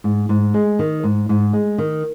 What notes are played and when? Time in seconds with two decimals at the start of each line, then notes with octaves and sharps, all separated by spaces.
0.04 G#2
0.29 G#2
0.54 G#3
0.79 D#3
1.03 G#2
1.29 G#2
1.53 G#3
1.78 D#3